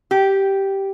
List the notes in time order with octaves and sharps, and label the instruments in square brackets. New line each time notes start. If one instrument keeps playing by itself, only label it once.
[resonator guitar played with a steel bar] G4